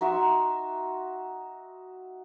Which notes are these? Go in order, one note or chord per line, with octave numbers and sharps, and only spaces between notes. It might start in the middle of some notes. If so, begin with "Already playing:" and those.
D#4 F#4 E5 C6